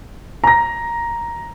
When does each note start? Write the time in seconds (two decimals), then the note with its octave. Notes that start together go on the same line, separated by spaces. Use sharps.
0.44 A#5 A#6